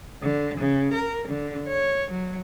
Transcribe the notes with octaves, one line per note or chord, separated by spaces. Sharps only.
D3
C#3
A#4
D3
C#5
F#3